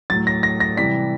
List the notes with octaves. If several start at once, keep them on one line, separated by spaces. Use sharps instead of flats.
A2 F#3 A6
A#6
A#6
A#6
C3 E3 G3 B6